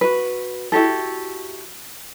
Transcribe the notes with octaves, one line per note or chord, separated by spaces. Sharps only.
F#4 B4
E4 F#4 G4 A4